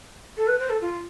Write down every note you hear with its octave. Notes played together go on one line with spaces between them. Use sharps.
A4
B4
C5
A4
F4